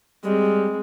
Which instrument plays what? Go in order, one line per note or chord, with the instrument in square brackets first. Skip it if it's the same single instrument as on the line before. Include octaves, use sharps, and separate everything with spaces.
[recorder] G3 [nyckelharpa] G#3 C4